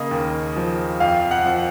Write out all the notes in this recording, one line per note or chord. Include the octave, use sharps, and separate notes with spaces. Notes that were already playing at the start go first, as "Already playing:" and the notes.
Already playing: C#3 A#3 D#5
D#2
F3
F2 F5
F#5
F3